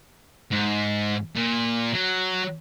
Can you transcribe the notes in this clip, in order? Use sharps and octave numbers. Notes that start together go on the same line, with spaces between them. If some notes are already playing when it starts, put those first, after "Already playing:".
G#2
A#2
F#3